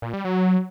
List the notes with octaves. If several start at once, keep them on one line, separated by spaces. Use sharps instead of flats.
A#2
G3
F#3